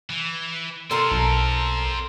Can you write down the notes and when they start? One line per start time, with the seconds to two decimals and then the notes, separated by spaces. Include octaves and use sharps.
0.10 E3
0.91 C4 F4 A4 A#4 C6
1.11 B1 A#5